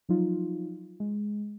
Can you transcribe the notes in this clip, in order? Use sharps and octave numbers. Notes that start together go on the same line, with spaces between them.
F3 F#3 D#4 F4
G#3